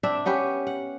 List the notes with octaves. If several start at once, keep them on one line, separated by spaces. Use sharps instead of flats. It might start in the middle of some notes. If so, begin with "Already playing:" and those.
C4 D4 E5
B3 C#4 G4 B4
F#5